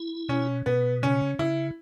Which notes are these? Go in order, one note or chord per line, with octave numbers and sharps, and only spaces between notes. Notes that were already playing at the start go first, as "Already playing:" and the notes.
Already playing: E4
B2 C#4
B2 B3
C#3 C#4
C#3 E4